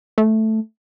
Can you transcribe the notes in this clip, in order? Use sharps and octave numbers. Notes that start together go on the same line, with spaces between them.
A3